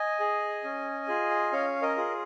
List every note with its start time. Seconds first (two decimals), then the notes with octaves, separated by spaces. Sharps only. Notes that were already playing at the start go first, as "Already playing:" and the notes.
Already playing: D#5 G#5
0.20 G#4
0.64 C#4
1.08 F4 G#4
1.52 C#4 C#5 F5
1.82 A#4 D#5
1.97 F4 G#4